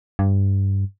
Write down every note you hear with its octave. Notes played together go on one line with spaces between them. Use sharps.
G2